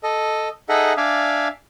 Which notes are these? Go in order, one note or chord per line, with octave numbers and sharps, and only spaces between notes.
A4 D#5
D#4 G#4 A4 D#5 E5 F#5
D4 D5 E5 F5 G#5